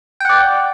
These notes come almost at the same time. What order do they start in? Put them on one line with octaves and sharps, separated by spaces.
G5 F#5 D5